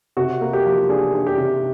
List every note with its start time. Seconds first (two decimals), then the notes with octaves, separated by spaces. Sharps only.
0.17 C3 F#4
0.41 A#3
0.53 G4
0.65 F3
0.89 D4 G#4
1.14 D4
1.26 G4
1.38 C3